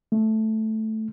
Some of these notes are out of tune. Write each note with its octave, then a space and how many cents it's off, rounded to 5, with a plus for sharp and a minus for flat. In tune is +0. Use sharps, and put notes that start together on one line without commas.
A3 -5